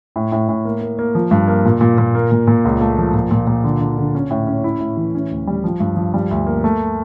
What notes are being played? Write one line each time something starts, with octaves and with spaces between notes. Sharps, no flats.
A2
A2
A2
A#3
A#3
A#3
F3
G2
A#3
A#2
A#2
A#2
A#3
A#2
A#2
C#2
A3
F3
A#2
A#2
A#2
D3
D3
D3
C#4
A2
C#4
E4
A2
E3
C#4
D2
G3
F3
G2
F3
G3
D2
A#3
A3